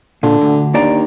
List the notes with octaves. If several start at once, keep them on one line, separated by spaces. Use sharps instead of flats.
A#2 D3
D2
D#2 D4 D5 A#5